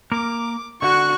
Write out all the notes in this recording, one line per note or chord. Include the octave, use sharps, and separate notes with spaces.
A#3 A#4 D6
D3 F#4 C#6 F#6